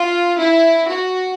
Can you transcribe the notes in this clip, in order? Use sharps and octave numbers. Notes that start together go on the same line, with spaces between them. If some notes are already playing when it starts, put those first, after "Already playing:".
Already playing: F4
E4
F#4